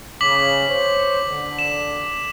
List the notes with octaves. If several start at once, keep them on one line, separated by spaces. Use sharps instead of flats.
C#3 D6 B6 F#7
C5 C#5
D3
E7